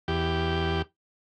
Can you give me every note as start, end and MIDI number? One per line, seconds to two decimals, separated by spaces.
0.08 0.82 40
0.08 0.82 67